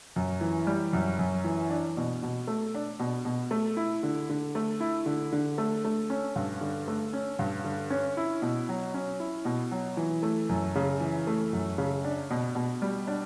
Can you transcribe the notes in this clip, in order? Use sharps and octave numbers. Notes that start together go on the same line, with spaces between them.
F#2
E3
G3
F#2
F#2
E3
D4
B2
B2
A3
D4
B2
B2
A3
E4
D3
D3
A3
E4
D3
D3
A3
A3
C#4
G2
D3
A3
C#4
G2
D3
C#4
E4
B2
F#3
C#4
E4
B2
F#3
E3
A3
F#2
C#3
E3
A3
F#2
C#3
D4
B2
B2
G3
D4